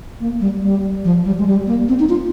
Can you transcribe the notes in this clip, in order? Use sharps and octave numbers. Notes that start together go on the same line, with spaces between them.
A#3
G3
G3
F3
G3
G#3
G3
A#3
C4
D#4
F4